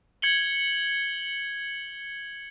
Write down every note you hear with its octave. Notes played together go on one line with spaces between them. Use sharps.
G#6 C#7 F#7 G7